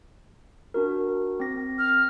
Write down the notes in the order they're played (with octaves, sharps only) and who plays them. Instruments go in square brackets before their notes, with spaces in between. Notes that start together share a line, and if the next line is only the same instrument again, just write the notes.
[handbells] D4 F#4 A#4
C4 A#6
[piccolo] F6